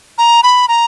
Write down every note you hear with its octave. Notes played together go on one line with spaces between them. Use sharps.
A#5
B5
A#5